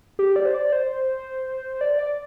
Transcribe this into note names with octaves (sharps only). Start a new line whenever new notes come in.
G4
D5
C5
D5
C5
D5
D5